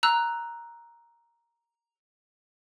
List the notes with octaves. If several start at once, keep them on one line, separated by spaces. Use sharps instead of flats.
A#5 E6 F#6